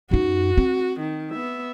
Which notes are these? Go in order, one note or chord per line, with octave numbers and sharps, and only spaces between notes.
F#2 D#4 F#4
C4
D#3
B3 E5